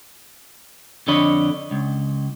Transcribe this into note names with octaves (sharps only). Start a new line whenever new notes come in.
F2 D3 D4 C#5 D#5 B5
C#2